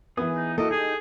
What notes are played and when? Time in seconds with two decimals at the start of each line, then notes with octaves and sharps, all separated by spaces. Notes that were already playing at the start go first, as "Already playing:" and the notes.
0.17 E3 B3 G#4 D#6
0.34 D#4
0.58 A#3 E4 F#4 A4 D#5
0.71 D#4 G4 G#4 D#5